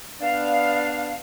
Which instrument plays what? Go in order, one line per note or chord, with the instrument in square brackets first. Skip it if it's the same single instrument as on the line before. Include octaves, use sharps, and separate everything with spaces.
[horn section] B3 D4 [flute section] F5